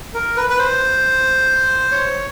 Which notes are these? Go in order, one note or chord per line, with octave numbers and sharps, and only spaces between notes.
A#4
B4
B4
C5
C#5